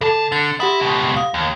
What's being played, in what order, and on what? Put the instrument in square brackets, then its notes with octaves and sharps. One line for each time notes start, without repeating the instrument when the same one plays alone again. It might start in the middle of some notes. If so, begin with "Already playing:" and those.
[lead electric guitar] C#3 A5 [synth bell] A4
[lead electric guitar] D3 [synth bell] A6
[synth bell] G4 F#5 D#6 [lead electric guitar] E5 B5
[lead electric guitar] C#2 B2
[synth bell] F5 D#6
[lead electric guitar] D#2